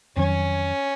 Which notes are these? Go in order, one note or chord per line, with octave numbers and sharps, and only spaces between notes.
F2 D#3 F#3 C#4